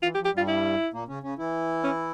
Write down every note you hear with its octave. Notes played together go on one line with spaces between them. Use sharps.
E3 F4
G4
F3
G4
G2 G3 F4
E4
A#2 A#3
C#3 C#4
C#3 C#4
E3 E4
C#4